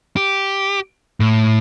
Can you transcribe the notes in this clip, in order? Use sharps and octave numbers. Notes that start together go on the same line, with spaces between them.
G4
A2